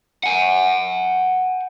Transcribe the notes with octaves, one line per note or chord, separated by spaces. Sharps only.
F#5 G#5